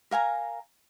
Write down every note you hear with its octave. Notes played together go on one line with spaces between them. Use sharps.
A#4 F5 G#5 A#5